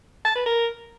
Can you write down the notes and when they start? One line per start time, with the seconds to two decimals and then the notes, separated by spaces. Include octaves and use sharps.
0.25 A5
0.36 B4
0.46 A#4